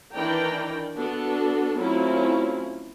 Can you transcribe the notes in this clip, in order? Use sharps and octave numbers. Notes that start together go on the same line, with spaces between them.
D#3 E3 D4 D5 G5 A#5
B3 D4 F#4 A4
F#3 A3 C4 C#4 E4 F4